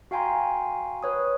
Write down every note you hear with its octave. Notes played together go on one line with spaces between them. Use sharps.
F#4 F5 G5 G#5 A#5 C6
B4 C#5 D#6